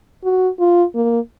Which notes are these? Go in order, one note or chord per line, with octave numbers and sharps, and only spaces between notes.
F#4
F4
A#3